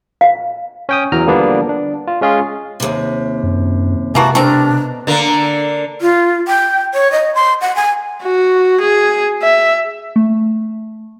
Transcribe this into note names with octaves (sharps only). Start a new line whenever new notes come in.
F5
C#4 G5 D#6
E2 E3 F#3 A#5 F6
D3 F3 G3 A#3 B3 D4
D4
F4
G#3 C#4 F4 G#4
D#2 C3
F#2
C3 E3 G#3 A#3 F#4 A5
B2 A3 C4 D4 A#4 A#5
D3 A#3
F4
G5
C#5
D#5
C6
F#5
G#5
F#4
G#4
E5
A3